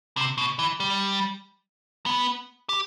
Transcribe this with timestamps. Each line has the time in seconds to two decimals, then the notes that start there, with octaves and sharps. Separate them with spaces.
0.17 C3
0.38 B2
0.59 E3
0.80 G3
2.06 B3
2.69 G4